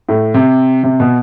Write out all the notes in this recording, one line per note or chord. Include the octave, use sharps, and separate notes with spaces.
A2
C3
C3
B2